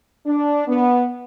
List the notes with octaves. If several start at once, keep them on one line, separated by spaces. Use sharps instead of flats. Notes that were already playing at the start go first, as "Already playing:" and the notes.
D4
B3